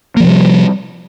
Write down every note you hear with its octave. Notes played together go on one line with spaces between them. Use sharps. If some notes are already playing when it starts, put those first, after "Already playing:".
C3 F3 G3 A#3